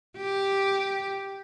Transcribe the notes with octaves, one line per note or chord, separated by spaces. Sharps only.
G4